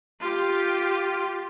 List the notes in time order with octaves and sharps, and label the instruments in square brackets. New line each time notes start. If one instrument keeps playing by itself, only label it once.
[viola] F4 G4